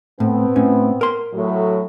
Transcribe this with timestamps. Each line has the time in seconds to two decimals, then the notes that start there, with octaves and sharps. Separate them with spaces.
0.20 A2 B3 C4
0.56 A2 C#4
1.01 A#4 C6
1.34 A2 F#3